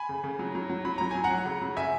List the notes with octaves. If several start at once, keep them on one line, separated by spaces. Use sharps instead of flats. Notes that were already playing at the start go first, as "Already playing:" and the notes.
Already playing: G#5 B5
C#3
C#3
F#3
F#3
F#3
F#3 B5
F#3 A#5
F#3 G#5
F#5 A#5
F#3
C#3
F#3
C#3 E5 G#5